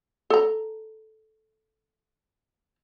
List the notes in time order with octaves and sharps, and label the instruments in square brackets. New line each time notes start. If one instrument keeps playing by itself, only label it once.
[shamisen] A4 A#5